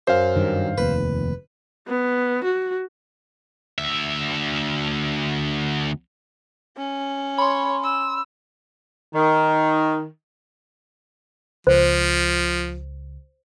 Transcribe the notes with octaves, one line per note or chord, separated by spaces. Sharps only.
F#2 C5 F5
G2 D#3
F1 D#2 B4
B3
F#4
D2 E5
C#4
C#5 B5 C6
E6
D#3
C#2 F3 C5